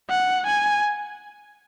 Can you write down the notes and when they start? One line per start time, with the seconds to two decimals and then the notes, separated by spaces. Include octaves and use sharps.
0.10 F#5
0.47 G#5